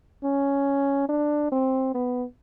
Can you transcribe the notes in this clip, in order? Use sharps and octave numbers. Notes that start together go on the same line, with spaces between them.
C#4
D4
C4
B3